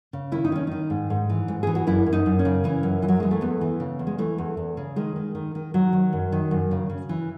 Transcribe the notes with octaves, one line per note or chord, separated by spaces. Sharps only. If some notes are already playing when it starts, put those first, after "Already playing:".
C#3
D#3 E4
D#4
D#3 C#4
D#3 D#4
G#2
G#2
E3
G#2
E3 G#4
F#4
F#2 E4
F#2
D#4
F#2
C#4
C#3
E3 C#4
F#2
E3
F#3
E3 G#3
A3
E2 B3
E3
C#3
E2
G#3
E3 A3
E2
E2
C#3
D#3 G#3
D#3
D#3
D#3
D#3 F#3
D#3
F#2
D#3
F#2
C#3
C#3
E3